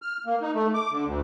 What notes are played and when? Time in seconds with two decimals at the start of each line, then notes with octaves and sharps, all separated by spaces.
0.02 F6
0.26 A#3
0.41 D#4
0.55 A3
0.74 D6
0.91 D3
1.06 D2